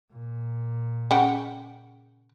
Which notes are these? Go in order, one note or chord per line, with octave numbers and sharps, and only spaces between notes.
A#2
C#3 F#5 G5